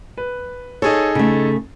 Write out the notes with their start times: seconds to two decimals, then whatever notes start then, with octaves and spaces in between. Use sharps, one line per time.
0.18 B4
0.82 D#4 G#4 A4 C#5
1.15 C#3 A3